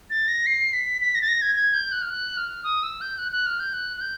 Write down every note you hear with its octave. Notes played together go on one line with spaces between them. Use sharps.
A6
A#6
C7
B6
B6
A#6
A6
A#6
G#6
G#6
G6
F#6
F6
F#6
F6
D#6
E6
G6
F#6
F#6
F6
G6
F#6
F#6
G6